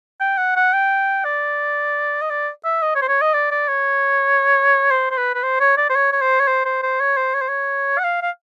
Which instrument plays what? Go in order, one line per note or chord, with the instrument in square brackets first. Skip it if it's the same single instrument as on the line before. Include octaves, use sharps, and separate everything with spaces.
[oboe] G5
F#5
F#5
G5
D5
D#5
D5
E5
D#5
C#5
C5
C#5
D#5
D5
D5
C#5
C5
C5
B4
B4
C5
C#5
D5
C5
C#5
C#5
C5
C#5
C5
C5
C5
C#5
C5
C#5
C5
C#5
F#5
F5
F5